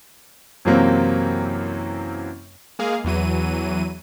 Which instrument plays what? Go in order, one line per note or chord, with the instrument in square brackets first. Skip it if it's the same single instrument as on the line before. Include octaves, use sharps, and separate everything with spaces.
[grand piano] F#2 C3 E3 F#3 A#3 C4
[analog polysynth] G#3 A#3 G#4 F5
E2 E3 F#3 D#7